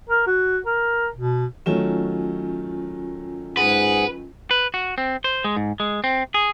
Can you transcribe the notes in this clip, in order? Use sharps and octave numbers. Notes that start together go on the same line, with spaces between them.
A#4
F#4
A#4
B2
D#3 F#3 A3 C#4 F4 G#5
G#2 G#4 B4 F#5
B4
F#4
C4
C5
G#3
G#2
G#3
C4
G#4